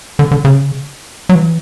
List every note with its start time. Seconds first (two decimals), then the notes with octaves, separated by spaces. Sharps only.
0.19 D3
0.31 D3
0.45 C#3
1.29 F#3
1.35 E3